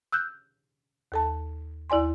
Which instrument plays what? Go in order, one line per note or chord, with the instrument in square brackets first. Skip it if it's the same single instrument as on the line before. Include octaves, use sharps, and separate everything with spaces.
[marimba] E6 F#6 G6
D#2 A4 A5
D#2 E4 D5 G#5 C6